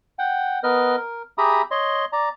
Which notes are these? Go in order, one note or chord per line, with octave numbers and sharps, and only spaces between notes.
F#5 G5
B3 A#4 B4 D#5 F6
A#4
G4 G#4 E5 A#5 B5 D#6
C#5 D#5 C6
D5 A#5